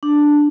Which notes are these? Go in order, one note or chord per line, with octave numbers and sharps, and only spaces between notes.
D4